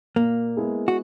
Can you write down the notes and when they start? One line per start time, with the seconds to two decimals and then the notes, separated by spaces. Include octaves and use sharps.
0.16 A#2 A#3
0.57 G#3 B3 E4 G#4
0.88 F#4